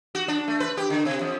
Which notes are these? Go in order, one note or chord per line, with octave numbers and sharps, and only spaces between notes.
F#4
D4
A3
B4
G4
D3
C3
F2